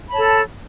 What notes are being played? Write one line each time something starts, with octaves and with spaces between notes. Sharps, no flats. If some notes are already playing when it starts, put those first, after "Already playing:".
A4 C#5 A5 B5